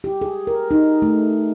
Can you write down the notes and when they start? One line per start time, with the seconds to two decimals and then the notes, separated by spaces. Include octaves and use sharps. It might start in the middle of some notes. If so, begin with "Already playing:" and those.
0.04 G4
0.21 G#4
0.47 A#4
0.71 D#4
1.02 A3